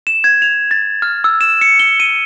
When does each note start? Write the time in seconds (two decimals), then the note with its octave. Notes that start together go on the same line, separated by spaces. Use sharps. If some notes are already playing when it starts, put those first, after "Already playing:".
0.07 E7
0.24 G#6
0.42 F7
0.71 A6
1.02 F6
1.24 E6
1.41 E7
1.61 C#7
1.80 G7
2.00 D#7